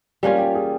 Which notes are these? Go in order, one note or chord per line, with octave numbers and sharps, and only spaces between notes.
G3 A#3 C#4 F4 G4
G4
G#4